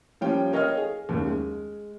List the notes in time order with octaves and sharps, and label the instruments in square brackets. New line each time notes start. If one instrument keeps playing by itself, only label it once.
[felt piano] F3 G3 A#3 C#4 F4 G5
A#4 C#5 D#5 F5 G5 F6
G#4
F#1 D#2
G#3